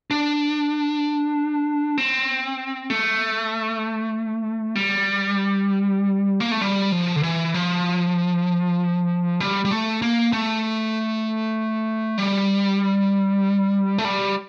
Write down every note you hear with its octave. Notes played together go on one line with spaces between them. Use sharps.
D4
C4
A3
G3
A#3
A3
G3
F3
D3
E3
F3
G3
G3
A3
A#3
A3
G3
A3
G3